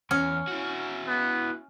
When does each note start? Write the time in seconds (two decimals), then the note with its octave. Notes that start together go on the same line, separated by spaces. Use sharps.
0.11 E2 C#4 F6
0.48 E4 F#4
1.07 B3